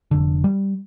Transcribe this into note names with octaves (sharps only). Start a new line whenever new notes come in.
F1 D3
G3